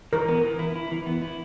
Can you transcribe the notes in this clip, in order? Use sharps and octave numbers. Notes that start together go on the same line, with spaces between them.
E3 A#4
B3
E3
E4
E4
E3
B3
E4